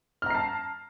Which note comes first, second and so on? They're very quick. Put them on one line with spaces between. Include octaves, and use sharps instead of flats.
F6 A#5 C7 A5